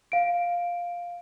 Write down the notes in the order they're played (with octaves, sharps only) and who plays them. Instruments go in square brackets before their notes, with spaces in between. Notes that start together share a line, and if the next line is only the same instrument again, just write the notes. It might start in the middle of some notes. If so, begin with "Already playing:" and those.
[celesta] F5 D7